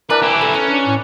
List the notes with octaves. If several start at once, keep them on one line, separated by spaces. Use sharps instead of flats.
E3 D4 A#4 B4
E4 G4
A4 A#5
C#4 B4
D4
A2